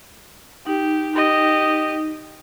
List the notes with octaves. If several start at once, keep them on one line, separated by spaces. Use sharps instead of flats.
D#4 G4
G4 D#5